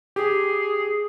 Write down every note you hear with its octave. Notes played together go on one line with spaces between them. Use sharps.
G4 G#4